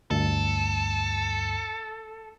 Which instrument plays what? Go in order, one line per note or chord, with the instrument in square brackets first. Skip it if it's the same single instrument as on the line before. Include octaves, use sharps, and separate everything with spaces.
[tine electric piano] D2 G2 [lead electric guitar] A4